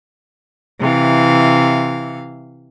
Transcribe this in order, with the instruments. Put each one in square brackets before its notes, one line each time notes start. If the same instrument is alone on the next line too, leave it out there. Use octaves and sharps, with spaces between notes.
[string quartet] C3 E3 F5